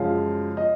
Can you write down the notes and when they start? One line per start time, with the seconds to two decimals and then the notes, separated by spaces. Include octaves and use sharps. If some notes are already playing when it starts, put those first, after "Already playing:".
Already playing: F#2 C#3 F3 G#3 F5
0.57 D#5